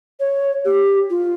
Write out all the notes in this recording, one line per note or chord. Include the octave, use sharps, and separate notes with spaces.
C#5
G4
F4